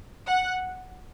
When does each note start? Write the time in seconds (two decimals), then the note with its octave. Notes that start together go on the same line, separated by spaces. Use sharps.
0.27 F#5